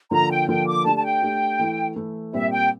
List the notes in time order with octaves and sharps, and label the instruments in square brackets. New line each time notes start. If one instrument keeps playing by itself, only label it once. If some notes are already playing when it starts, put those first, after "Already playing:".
[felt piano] D3 F3 A#3 F4 A4 [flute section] A#5
[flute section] G5
[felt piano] D3 F3 A#3 F4 A4 [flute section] G5
[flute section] D6
[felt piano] A3 D4 G4 [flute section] A5
[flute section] A5
G5
[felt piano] A3 D4 G4
E3 A3 E4
E3 A3 E4
[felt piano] A#2 G3 C4 [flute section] E5
[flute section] G5